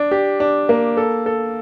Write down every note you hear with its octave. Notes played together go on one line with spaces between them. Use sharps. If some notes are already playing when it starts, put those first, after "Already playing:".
Already playing: D4
G4
D4
A#3
A4
A4